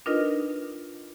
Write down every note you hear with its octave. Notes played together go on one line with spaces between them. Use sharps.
D4 D#4 F4 A#4 B4 D#5